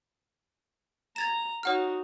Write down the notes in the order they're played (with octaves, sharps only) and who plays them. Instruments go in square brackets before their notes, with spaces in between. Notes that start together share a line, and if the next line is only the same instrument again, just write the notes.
[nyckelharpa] A#5 [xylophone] G#6 A6 E7
[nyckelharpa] D#4 F#4 [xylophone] C#5 F#5 F6